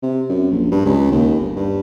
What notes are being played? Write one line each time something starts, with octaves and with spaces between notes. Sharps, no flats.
C3
F#2
A#1
G2
C#2
D#2
G1
G2